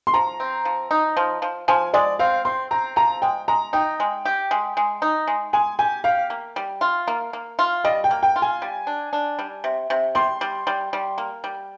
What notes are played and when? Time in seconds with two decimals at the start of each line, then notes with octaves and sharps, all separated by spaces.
0.07 C6
0.14 F3 A#5
0.40 C4
0.65 F3
0.91 D#4
1.17 F3
1.42 F3
1.68 F3 G#5
1.94 G#3 D5
2.19 C4 F5
2.45 C4 C6
2.71 C4 A#5
2.96 F3 A#5
3.22 G#3 G5
3.48 G#3 A#5
3.73 D#4 G5
4.00 G#3
4.25 G4
4.51 G#3
4.77 G#3
5.02 D#4
5.27 G#3
5.53 G#3 G#5
5.79 G4 G#5
6.04 G4 F5
6.30 A#3
6.56 G3
6.81 F4
7.08 A#3
7.33 A#3
7.59 F4
7.84 G3 D#5
8.04 G5
8.11 A#3
8.23 G5
8.36 F4
8.42 G#5
8.62 G3
8.87 D4
9.13 D4
9.39 G3
9.64 C3
9.90 C3
10.15 G3 C6
10.41 G3
10.67 G3
10.93 G3
11.18 A#3
11.44 G3